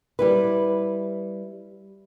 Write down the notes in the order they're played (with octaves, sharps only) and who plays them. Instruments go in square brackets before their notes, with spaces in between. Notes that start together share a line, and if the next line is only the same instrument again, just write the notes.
[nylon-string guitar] G3 E4 B4